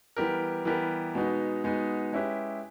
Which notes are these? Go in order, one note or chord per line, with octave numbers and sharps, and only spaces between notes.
E3 G3 B3 G4 A#4
E3 G3 B3 G4 A#4
B2 G#3 B3 D#4
B2 G#3 B3 D#4
G#3 C#4 E4 G4 B4